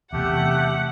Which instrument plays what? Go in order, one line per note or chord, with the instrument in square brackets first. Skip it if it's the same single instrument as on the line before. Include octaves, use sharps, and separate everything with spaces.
[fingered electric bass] E2 C3 [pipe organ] A3 G4 [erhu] F#5